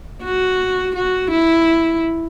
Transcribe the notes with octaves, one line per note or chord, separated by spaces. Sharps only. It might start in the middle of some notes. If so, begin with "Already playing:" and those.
F#4
F#4
E4